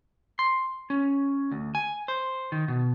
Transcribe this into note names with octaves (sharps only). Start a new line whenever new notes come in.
C6
C#4
D2
G#5
C5
D#3
B2